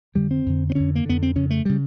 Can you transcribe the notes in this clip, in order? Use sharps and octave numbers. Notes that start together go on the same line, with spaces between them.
F2 D3 G3
C4
F2 D3
C4
F2 D3 C#4
A#3
F2 D3 B3
C4
F2 C#3 C#4
A3
C#3 G3